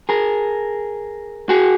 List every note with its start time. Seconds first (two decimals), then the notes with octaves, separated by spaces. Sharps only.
0.09 G#4 A#4
1.49 F#4 G#4